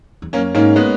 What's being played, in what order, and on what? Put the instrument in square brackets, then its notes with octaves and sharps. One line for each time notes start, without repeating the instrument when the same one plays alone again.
[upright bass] E2
[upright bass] F#2 [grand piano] A#3 C#4
[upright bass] G#2 [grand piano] A#3 C#4
[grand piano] G#3 B3